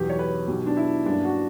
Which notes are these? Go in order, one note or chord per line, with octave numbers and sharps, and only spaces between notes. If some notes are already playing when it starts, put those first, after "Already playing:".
Already playing: E1 E2 B2 F#3 G4
C#5
B4
B1 B2 F#3 G4
D4
E4
G2 F#3 A#3 C#4 D4
F#4